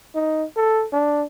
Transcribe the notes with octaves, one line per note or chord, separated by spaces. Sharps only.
D#4
A4
D4